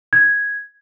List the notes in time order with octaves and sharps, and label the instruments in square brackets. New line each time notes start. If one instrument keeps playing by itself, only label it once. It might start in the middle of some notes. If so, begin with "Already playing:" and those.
[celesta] G#6